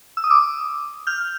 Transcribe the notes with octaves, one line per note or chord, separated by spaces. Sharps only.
E6
D#6
D6 E6
F6 G6